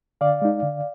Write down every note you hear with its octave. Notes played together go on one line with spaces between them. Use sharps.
D3 D5 F5
G#3 D#4
D3